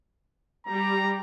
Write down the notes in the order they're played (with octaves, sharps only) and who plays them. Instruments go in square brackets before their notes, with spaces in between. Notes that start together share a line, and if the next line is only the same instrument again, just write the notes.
[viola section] G3 G4 [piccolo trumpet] A#5